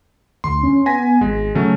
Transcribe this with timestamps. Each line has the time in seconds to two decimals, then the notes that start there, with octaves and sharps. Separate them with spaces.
0.44 D2 C6
0.63 C#4
0.86 B3 G#5 A#6 B6
1.21 G#1 G#3
1.55 C#3 F#3 A3 C#4